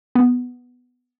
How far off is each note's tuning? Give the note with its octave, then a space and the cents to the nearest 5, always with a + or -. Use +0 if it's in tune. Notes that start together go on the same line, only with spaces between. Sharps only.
B3 +5